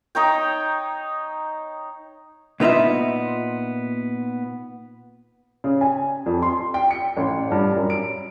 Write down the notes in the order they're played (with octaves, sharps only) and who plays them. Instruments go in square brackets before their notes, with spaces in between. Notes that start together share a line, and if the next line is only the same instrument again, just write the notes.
[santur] D#4 C#5 G5
[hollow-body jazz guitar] A#2 B3 D#4 F4 E5
[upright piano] C#3
G#5
F2
C6
G5
C#7
A1
G2
F#2
D7